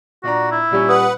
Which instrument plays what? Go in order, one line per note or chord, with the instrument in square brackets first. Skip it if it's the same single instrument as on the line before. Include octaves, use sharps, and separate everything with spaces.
[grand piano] A#2 D4 A#5 [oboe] F#4
[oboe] E4
[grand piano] A#2 G3 C#4
[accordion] B4 F#5 [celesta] D#6